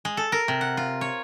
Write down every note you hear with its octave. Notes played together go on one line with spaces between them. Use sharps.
G#3
A4
A#4
C3
F#5
F4
C#5